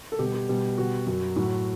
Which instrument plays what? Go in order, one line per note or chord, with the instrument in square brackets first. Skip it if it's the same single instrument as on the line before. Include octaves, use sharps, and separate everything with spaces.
[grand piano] A4
B2 G3 G4
G4
B2 G3
B2 G3 F#4
F#2 F#3 F#4
A2 F#3 F#4